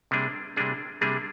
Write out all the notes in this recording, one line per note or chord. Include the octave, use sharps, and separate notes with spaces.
C3 G3 A#3 D4 G#4
C3 G3 A#3 D4 G#4
C3 G3 A#3 D4 G#4